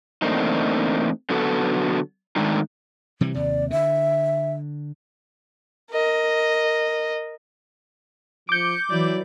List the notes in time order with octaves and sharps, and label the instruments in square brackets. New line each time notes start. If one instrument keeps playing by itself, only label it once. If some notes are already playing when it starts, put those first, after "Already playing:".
[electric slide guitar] E2 A3 A#3 C4 D4 D#4
D3 F#3 B3 F#4 A4
D#3 G#3 A3 D4 D#4
[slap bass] C3 E3 G3
[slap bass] D#2 C3 [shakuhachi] D5
[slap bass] D3 [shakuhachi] E5
[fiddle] A#4 D#5
[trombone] F3 [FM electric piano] D6 G6 [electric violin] C#7 D7
[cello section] E3 [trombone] F#3 [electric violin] E4 D5